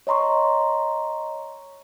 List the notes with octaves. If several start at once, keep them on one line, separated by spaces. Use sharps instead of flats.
C#5 D#5 A#5 C6 C#6